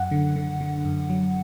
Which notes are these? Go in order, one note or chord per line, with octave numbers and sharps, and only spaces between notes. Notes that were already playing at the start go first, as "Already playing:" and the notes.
Already playing: F#2 F#5
D3
D3
D3
F#2
F#3